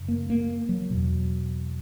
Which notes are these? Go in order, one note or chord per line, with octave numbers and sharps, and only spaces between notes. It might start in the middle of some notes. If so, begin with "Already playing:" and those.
Already playing: F#2 C#3
A#3
A#3
F#3
E2 B2